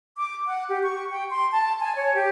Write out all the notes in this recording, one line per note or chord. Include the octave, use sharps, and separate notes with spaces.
D6
F#5
G4
C#6
G5
C6
A5
G#5
C#5
G4